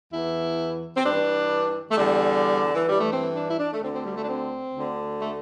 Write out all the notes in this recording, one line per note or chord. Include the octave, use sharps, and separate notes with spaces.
E2 E3 E4
C4
G2 E3 D4
A3
E2 D3 G3
E3
G2 E3 G3
A3
C4
D4
E4
D4
A3
D2 D3 C4
C4
G3
A3
D4
C4
D2 D3
A3